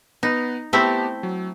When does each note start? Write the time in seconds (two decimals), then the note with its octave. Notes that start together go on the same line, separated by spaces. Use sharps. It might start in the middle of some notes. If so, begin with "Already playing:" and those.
0.23 B3 D#4 B4
0.73 A3 B3 C4 E4 G4 A5
1.23 F#3